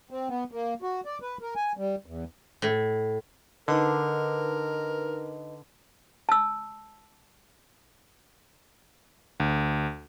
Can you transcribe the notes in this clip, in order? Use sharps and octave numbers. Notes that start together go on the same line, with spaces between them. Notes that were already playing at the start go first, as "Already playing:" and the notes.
C4
B3
A#3
F#4
D5
B4
A#4
G#5
G3
E2
A2
D3 D#4 A#4 B4 D#5
A5 E6
D2